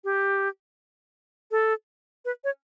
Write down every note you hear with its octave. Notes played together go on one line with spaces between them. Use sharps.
G4
A4
B4
C#5